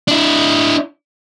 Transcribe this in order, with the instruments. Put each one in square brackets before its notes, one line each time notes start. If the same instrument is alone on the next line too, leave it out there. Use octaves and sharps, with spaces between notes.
[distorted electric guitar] D4 E4